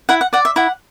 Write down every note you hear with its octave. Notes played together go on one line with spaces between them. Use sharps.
E4 F#5
F#5
D5 F#5
E5
E4 F#5